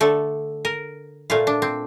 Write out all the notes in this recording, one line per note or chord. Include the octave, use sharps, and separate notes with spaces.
D3 A3 A4
A#4
A#2 A3 F4
D4
C4